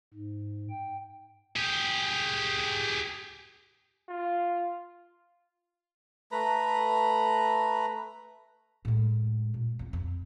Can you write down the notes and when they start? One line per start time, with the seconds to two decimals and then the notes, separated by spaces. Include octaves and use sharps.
0.13 G#2
0.70 G5
1.56 G4 G#4
4.09 F4
6.32 A3 B4 A#5 B5
8.85 A2 G#3
9.54 A#2
9.79 F2 C4
9.93 F2